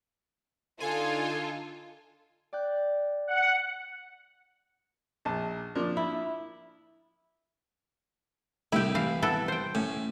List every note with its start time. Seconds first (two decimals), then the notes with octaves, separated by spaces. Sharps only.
0.80 D3 D4 D#4 F4 A4 G#5
2.53 D5 G5 F#6
3.28 F#5
5.25 A#1 A5
5.75 F3 A#3 D4
5.97 E4
8.72 C2 A2 E4 G4
8.95 E3 F5
9.22 B3 E4 A4
9.48 C5 G5
9.75 A2 C#4